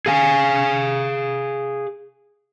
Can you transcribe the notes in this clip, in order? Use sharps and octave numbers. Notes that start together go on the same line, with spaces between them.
G#4 F5 G#5